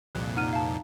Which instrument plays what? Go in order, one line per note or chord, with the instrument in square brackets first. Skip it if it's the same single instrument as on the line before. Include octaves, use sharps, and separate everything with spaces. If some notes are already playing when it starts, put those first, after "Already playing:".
[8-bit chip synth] C2 F2 A#2 [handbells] F#6
[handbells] D#4 [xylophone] F#5 F6 D#7
[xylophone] F5 A5